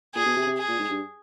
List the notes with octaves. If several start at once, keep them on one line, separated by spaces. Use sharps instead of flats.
A#2 G#4
B2
C3
C3
G#4
A#2
G#2
G2